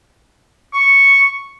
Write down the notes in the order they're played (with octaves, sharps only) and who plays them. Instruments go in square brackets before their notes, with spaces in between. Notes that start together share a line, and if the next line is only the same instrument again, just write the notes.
[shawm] C#6